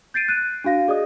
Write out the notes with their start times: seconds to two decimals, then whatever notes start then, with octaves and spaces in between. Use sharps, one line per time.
0.14 G6 A6 C7 D7 D#7
0.28 F#6 D#7
0.64 D4 F#4 F5 A#6
0.88 G#4 D5 D#5 D#6